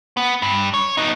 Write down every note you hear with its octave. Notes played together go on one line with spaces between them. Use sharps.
B3
G2
C#5
B3 D#4